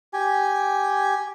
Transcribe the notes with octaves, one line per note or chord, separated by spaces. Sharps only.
G4 G#5